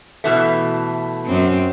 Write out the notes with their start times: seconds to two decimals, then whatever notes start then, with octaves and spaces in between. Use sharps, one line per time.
0.24 B2 E3 A3
1.26 F#2 C4